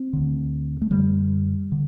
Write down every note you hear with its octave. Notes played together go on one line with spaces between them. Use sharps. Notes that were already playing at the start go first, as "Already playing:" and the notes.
Already playing: C4
D2 D3
A3
F#2 D3 G3
D3